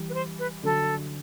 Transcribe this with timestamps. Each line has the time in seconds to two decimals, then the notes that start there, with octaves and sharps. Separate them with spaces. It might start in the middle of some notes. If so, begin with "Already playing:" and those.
Already playing: E3 G3
0.10 B4
0.14 C5
0.39 B4
0.63 D3 F#3 A4